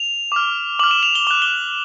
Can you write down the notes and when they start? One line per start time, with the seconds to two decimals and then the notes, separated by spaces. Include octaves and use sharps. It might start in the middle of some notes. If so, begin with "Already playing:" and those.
Already playing: F7
0.32 D6 F6
0.79 D6 F6 F#7
0.91 E7
1.03 F7
1.15 G7
1.27 D6 G7
1.31 F#6
1.42 G7